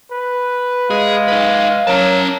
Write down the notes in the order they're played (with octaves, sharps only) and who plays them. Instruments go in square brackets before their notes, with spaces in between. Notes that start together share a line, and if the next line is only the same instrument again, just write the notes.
[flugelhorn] B4
[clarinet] G#3 [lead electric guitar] G#4 [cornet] F5
[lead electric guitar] D#4 B4
[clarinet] F#3 [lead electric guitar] C#4 A5 [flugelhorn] A#4